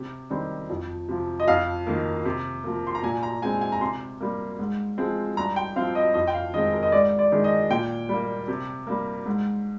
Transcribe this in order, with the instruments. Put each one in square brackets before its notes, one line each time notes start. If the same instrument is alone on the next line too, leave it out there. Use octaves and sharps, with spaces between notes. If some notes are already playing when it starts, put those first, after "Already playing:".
Already playing: [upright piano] C3
D#3 G3 C4
F2
C3 F3
D#5
F2 F5
D#3 A#3
C3
F3 A#3
C6
A#5
A#2 G#5
A#5
G#3 C4 G#5
G#5
A#5
C3 C6
G3 A#3
G#2
F3 G#3 C4
G2 A#5
G5
F3 C4 F5
D#5
F2 D#5
G5
F5
D#3 G#3 C4 D#5
A#4
D#5
G#2 D5
D5
D#3 G#3
D#5
A#2 G5
G3 A#3
C3
G3 A#3
G#2